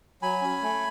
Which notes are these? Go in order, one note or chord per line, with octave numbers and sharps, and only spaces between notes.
F#3 G#5 B5
C#4
A3